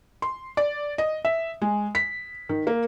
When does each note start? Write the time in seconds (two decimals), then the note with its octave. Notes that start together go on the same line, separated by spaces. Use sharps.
0.22 C6
0.57 D5
0.98 D#5
1.25 E5
1.62 G#3
1.95 B6
2.49 D#3
2.67 A#3